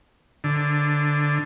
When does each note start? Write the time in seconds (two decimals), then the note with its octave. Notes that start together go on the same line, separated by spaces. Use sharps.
0.44 D3